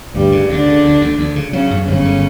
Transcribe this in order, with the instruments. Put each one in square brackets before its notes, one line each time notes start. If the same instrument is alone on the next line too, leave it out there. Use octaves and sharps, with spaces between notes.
[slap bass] D2 [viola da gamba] G2 G3
[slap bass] C#3
[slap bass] D2 [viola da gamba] D3 D4
[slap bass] C#3
D2
D2
D2
C#3
[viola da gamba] C#3 C#4 [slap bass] F#3
[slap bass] F#2
[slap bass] G1 [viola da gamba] C#3 C#4
[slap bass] D3